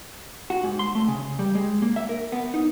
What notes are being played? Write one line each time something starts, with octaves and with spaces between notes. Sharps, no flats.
F#4
G#2
C6
A3
C#3
G3
G#3
A#3
E5
A#4
B3
D#4